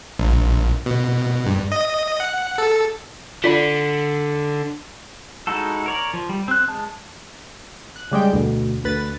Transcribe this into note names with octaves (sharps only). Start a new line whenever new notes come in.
A#1
B2
G2
D#5
F#5
A4
D3 F4 D5 B5 B6
G#3 D#4 E4 F#4 A4
A#4 C#5 D5
F3
G3
C4 F#6
G#3 A5
F#6
C#3 G3 G#3 G5
D2 B2
D2 B4 A6